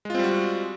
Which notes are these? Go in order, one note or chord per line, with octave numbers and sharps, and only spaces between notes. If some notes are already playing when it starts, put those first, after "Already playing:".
G3 G#3 C4 F4 F#4